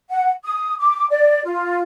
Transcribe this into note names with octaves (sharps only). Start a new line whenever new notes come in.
F#5
D#6
D6
D5
F4